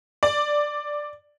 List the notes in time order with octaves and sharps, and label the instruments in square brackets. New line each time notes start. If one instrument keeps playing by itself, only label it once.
[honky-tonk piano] D5